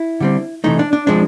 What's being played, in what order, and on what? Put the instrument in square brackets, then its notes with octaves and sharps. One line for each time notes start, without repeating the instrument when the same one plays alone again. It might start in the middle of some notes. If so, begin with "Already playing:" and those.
Already playing: [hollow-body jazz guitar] E4
D3 G3 C4
C3 E3 A3 D#4
D4
D4
F3 G#3 C4 D4